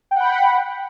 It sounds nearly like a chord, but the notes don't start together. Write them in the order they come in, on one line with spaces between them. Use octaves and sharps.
G5 F#5 B5